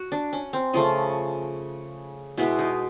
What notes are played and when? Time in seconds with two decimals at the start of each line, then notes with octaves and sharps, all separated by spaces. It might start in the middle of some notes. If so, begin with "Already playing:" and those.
Already playing: F#4
0.12 D4
0.33 C#4
0.53 C4
0.73 C#3 F3 A3 F4
2.38 B2 G#3 B3 E4
2.59 D#4